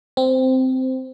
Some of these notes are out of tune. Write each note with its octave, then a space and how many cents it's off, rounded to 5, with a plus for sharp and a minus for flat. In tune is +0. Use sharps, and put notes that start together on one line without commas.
C4 -10